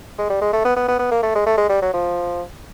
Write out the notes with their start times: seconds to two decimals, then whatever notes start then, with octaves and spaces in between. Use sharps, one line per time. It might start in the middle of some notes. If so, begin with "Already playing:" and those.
0.19 G#3
0.30 G3
0.42 G#3
0.53 A3
0.65 B3
0.76 B3
0.88 B3
0.99 B3
1.12 A#3
1.23 A3
1.35 G#3
1.47 A3
1.58 G#3
1.69 G3
1.82 F#3
1.94 F3